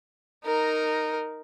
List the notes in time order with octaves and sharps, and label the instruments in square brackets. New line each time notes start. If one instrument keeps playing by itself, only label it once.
[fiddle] D#4 A#4